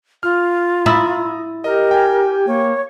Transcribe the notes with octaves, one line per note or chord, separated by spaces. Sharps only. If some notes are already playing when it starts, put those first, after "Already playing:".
F4 F6
E4 A#5 D#6 A6
G4 A#4 D#5
G5 G#5
A#3 C#5